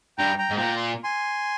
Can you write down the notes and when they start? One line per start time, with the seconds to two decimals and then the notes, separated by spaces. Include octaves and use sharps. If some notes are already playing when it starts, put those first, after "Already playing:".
0.18 G2 G5 A#5
0.38 G5 A#5
0.50 G#2
0.57 A#2 G5 A#5
0.77 C6
1.04 G#5 C6